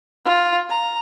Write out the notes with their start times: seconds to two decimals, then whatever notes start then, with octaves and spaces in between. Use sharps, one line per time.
0.25 F4
0.69 A#5